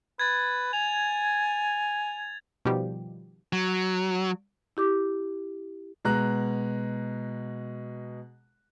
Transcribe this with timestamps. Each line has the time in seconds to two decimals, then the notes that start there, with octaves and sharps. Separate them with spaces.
0.19 B4 G#6 A6
0.73 G#5 F7
2.65 B2 D#3 F3 G3 G4
3.53 F#3
4.77 E4 G4 D6
6.05 B2 G#3 A#5 F#6